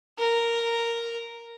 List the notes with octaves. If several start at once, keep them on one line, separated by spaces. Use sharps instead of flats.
A#4